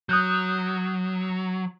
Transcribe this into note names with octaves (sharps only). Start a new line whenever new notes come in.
F#3 D#6 F#6 G6